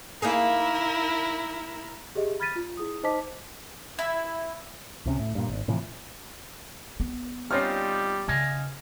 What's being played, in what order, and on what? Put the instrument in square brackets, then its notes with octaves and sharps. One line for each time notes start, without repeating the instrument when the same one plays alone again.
[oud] A#3 D#4 G#4 [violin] E4 A#4
[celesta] G4 G#4 D#5 E5
B5 F6 G#6 A6 B6 D#7
F4
E4 G#4 D#6
D#4 C5 D#5 A5 D6 B6
[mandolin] E4
[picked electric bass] C#2 C3 C#4
A2
G2 A#2
G#1
A2 C3 E3 F3
[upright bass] B3
[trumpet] G3 [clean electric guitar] C4 D#4 F4 [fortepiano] C#4 F6
[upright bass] C#3 [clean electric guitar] D#5 F5 G#5